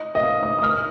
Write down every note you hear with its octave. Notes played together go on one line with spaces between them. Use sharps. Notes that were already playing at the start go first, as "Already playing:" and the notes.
Already playing: D#5
D#5
F5
D#6
D#6
F6